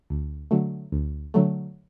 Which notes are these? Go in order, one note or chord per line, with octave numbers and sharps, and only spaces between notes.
D2
D3 F#3 A3
D2
D3 F#3 A3